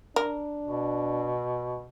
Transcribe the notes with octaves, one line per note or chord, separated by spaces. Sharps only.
D4 A#4
B2